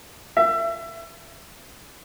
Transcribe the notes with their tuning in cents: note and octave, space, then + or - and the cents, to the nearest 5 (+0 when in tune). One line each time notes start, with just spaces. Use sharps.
E5 +25